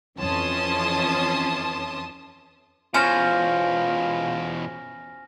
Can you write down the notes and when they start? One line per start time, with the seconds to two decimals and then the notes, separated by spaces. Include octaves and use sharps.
0.18 F2 E3 C#4 A5 C6 D#6
2.94 E2 B2 C#4 F4 C5 G#5 F6 A#6